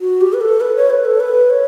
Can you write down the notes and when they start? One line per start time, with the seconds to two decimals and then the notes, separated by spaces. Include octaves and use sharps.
0.01 F#4
0.21 G4
0.33 B4
0.41 A4
0.61 B4
0.76 C#5
0.90 B4
1.05 A4
1.20 B4
1.50 C#5